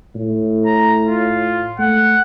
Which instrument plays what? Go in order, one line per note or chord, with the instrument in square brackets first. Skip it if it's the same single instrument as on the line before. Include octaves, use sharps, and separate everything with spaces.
[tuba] A2
[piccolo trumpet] A#5
F4
[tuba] A3 [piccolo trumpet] F#5